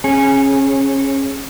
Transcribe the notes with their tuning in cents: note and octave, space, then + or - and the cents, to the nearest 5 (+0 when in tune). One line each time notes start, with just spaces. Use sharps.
C#4 -25 G#4 +0